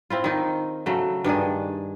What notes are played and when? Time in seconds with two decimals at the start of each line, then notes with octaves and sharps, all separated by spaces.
0.10 C4 E4 F4
0.24 D#3 D#4
0.86 C#3 F#3 A3
1.24 G2 D#3 D4 G#4